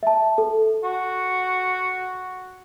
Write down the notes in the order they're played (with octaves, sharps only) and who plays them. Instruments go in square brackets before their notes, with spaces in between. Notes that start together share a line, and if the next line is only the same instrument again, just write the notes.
[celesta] E5 A5
A4
[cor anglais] F#4